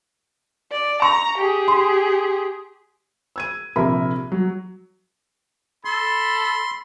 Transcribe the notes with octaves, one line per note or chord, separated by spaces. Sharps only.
D5
A#5 C#6
G4 G#4
C6
E6 G#6 D#7
A#1 C3 A#4 E5 B5
F#3
A4 B5 C6